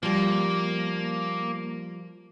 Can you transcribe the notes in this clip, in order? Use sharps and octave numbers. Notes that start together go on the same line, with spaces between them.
F3 G3 A#3